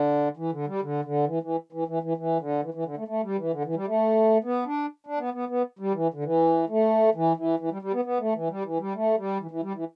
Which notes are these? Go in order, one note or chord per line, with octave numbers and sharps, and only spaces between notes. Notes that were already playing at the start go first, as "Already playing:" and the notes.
Already playing: D3
E3
D3
G3
D3
D3
E3
E3
E3
E3
E3
E3
D3
E3
E3
D3
A3
A3
G3
E3
D3
E3
G3
A3
B3
D4
D4
B3
B3
B3
G3
E3
D3
E3
A3
E3
E3
E3
G3
G3
B3
B3
A3
E3
G3
E3
G3
A3
G3
E3
E3
G3
E3